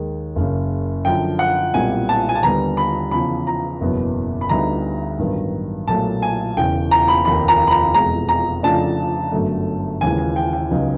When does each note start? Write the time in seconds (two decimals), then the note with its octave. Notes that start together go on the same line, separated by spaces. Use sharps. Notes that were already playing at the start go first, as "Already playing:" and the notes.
Already playing: D#2 D#3 G#3
0.36 F#1 F#2 C#3
1.05 F#2 D3 F3 G5
1.39 F#5
1.74 B1 A#2 G3 C4 E4 G#5
2.09 A5
2.29 G#5
2.35 A5
2.43 D#2 D3 G3 B3 A#5
2.77 B5
3.11 E2 C#3 F3 B5
3.47 A#5
3.81 F#1 E2 B2 F#3 B3
4.41 B5
4.49 D2 D3 G3 B3 D#4 A#5
5.18 A1 G2 D#3 F#3 B3
5.88 B1 A#2 F#3 A3 A5
6.22 G#5
6.57 E1 E2 C#3 E3 G5
6.91 A#5
7.08 B5
7.25 F1 D#2 D#3 B5
7.48 A#5
7.67 B5
7.71 A#5
7.94 F1 E2 B2 G#3 A#5
8.29 A#5
8.63 F2 C#3 F3 A3 D4 A5
9.32 G1 F#2 D3 F#3 A3
10.01 D#2 C#3 E3 G#3 G#5
10.18 G#5
10.36 G5
10.53 G5
10.71 C#2 C#3 F#3 B3 D#4